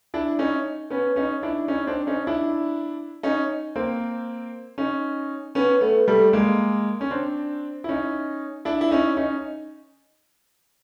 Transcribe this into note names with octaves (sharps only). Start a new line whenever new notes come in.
D4 E4
C#4 D#4
B3 C#4
C#4 D#4
D4 E4
C#4 D#4
C4 D4
C#4 D#4
D4 E4
C#4 D#4
A#3 C4
C#4 D#4
B3 C#4
A3 B3
G3 A3
G#3 A#3
C#4
C4 D4
E4
C#4 D#4
D4 E4
E4
C#4 D#4
C#4 D#4